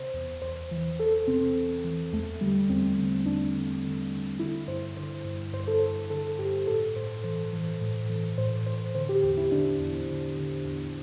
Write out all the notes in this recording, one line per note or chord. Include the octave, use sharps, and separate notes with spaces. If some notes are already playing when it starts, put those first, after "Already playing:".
Already playing: C3 C5
E2
E2 C5
E3
E3 A4
C3 C4
C3
E3
E2 A3
D3 G3
E2 C4
D3
E2 D4
D3
D3
D3
D3 E4
G2 C5
D3 C5
G2
G2 C5
A4
G2 C5
D3 A4
G2 G4
A2 A4
A2 C5
E3 C5
E3
A2
E3
A2 C5
A2 C5
D3 C5
G4
E2 G4
E4
D3 D4
E2
D3
D3
E2